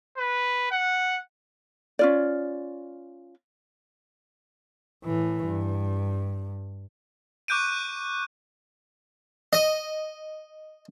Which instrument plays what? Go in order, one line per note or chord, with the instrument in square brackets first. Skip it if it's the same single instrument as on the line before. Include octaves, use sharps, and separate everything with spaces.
[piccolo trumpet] B4
F#5
[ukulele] C#4 F4 D5
[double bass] A2 E3
G2
[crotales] C#6 D6 F#6 G6 D7 D#7
[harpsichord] D#5